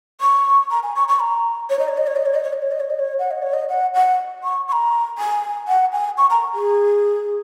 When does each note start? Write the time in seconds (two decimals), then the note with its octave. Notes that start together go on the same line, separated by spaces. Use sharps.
0.20 C#6
0.70 A#5
0.82 G#5
0.95 C#6
1.08 C#6
1.20 A#5
1.69 C#5
1.79 D#5
1.88 C#5
1.97 D#5
2.06 C#5
2.16 D#5
2.25 C#5
2.34 D#5
2.43 C#5
2.53 D#5
2.62 C#5
2.71 D#5
2.80 C#5
2.90 D#5
2.99 C#5
3.19 F#5
3.30 D#5
3.42 C#5
3.53 D#5
3.68 F#5
3.94 F#5
4.43 C#6
4.68 C#6
4.72 A#5
5.18 G#5
5.67 F#5
5.92 G#5
6.17 C#6
6.30 A#5
6.54 G#4